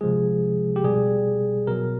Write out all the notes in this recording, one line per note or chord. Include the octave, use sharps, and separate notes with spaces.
C3 F3 G#3 G#4
G4
B2 G3 G#4
B2 F#3 A#4